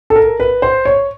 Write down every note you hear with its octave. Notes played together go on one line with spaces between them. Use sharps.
A4
A#4
B4
C5
C#5